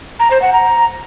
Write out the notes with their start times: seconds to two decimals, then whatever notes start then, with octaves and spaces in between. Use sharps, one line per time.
0.20 A#5
0.31 C5
0.42 F#5
0.53 A#5